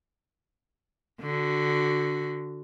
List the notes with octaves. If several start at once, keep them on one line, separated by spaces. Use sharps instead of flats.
D3 F#4